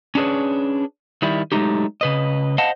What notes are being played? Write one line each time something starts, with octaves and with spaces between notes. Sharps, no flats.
C#4 D4 G#4 B4 C#5
D#3 G3 E4
F#3 G#3 A3 D#4 G4
C#3 B4 D#5
C5 D#5 F5 F#5 A5